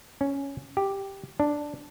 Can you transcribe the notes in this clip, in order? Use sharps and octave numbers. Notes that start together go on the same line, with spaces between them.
C#4
G4
D4